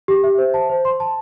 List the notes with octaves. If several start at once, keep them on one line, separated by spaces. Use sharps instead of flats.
G4
E5
C5
A5
C5
C6
A5